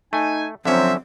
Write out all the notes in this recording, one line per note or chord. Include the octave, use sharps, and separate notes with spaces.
A3 D#4 G#5
D3 F3 F#3 C4 C#4 E5